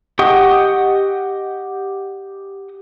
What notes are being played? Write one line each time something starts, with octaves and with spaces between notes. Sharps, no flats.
G4 D#5 F#5 C#6 D#6